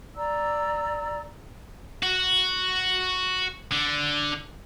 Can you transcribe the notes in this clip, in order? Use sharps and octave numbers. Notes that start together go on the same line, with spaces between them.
D5 A#5 E6
F#4
D3